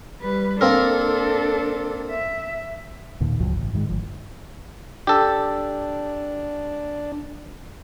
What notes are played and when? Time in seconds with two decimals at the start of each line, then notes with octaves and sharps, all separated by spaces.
0.20 G3 B4
0.61 A#3 C4 D4 A4 A#4
2.11 E5
3.20 D#2 A#2 D#3
3.40 C#2 G2 F3 F#3
3.56 A1
3.73 G#2 D#3 E3 G#3
3.89 G1 F3
5.07 D4 G4 A4